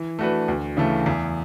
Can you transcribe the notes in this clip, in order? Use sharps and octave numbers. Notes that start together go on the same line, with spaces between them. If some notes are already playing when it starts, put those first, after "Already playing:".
Already playing: E3
A3 D4 F#4 B4
D2
C#3 E3 A3
E2